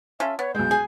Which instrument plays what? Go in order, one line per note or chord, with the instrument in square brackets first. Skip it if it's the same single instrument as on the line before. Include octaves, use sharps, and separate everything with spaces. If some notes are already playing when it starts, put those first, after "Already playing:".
[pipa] C#4 F4 A4 [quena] E5
[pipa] B3 [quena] C#5
[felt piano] B1 G#3 [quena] G6
[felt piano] G#4 [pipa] G#5